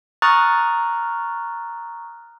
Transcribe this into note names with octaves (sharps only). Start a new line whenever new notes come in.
A#5 C#6 D#6 F6 F#6 A6